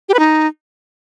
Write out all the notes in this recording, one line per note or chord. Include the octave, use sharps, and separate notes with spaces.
G4
B4
D#4